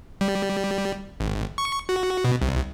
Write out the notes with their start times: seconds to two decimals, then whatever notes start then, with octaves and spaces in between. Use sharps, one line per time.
0.21 G3
1.20 G#1
1.58 C#6
1.89 F#4
2.24 B2
2.42 C2